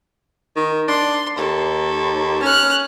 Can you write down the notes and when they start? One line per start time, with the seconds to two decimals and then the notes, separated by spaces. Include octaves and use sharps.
0.56 D#3
0.88 D4 C6
1.38 D#2 A4
2.42 C#4 F6 F#6